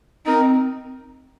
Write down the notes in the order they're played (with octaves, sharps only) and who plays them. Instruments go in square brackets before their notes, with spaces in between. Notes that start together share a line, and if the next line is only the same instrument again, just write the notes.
[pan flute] C4 [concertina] D#4 A#4